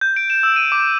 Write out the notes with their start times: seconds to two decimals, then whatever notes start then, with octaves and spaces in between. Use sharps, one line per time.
0.01 G6
0.16 D7
0.30 E7
0.43 E6
0.56 D#7
0.72 D6